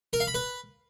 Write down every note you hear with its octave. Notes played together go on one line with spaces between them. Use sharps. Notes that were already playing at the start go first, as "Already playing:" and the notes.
A#4
F5
B5
B4